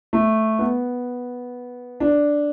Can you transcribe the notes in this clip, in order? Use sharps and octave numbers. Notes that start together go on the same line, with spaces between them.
A3
B3
D4